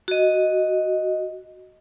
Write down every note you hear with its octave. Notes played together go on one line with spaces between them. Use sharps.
F#4 D#5